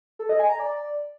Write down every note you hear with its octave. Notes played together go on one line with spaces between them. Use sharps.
A4
D#5
G#5
A#5
D5